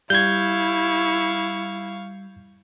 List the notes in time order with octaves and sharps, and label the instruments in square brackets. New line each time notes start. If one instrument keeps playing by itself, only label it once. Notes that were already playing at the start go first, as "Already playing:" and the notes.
[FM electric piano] G3 [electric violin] E4 [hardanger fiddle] F5 C#6 [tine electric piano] G6 G#6